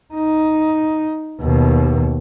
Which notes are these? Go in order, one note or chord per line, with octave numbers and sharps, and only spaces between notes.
D#4
D#2 B2